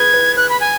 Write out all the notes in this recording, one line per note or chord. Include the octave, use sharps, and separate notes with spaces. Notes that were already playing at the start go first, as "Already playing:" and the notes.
Already playing: G#4 B4 G#6
B4
B4 F#6
B5
G#5